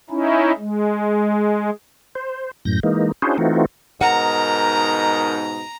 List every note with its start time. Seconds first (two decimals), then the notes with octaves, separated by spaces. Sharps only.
0.10 C#4 D#4 E4
0.58 G#3
2.15 C5
2.65 F#2 A2 G6 A#6
2.83 E3 G#3 A#3 D#4
3.22 C#4 D4 E4 F#4 G#4 C5
3.38 E3 A3 C4 D#4 F4 F#4
4.01 G#2 B2 D#4 A#4 F#5 A#5